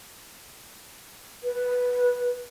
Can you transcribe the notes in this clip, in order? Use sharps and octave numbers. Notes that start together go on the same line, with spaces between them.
B4